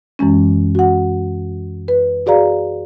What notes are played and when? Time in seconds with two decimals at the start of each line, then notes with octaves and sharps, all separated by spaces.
0.19 F#2 E3 G#3 C#4
0.75 F#4 F#5
1.88 B4
2.26 F#4 G#4 D5 F5 A#5